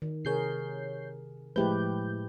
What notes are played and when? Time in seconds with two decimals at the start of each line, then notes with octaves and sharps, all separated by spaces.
0.02 D#3
0.25 C3 G#4 A#4 C#5 G6 C7
1.56 A2 F3 G#3 A3 E4 G4 B4 G6